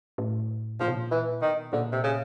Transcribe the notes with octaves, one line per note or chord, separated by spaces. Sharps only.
A2
A#2 F3
B2
A#2
E3
B2 D#3
A#2 D3
C3
C#3